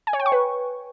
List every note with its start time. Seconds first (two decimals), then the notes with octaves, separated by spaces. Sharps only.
0.07 G#5
0.13 C#5
0.20 G5
0.26 C#6
0.32 B4